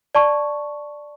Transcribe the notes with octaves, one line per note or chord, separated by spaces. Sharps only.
D5 A5 C#6